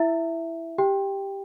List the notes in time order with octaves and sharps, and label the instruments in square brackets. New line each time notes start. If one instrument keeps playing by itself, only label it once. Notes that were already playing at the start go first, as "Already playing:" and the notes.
Already playing: [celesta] E4 E5
G4 G5